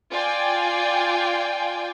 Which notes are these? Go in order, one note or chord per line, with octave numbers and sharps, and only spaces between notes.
F4 D5 G5 G#5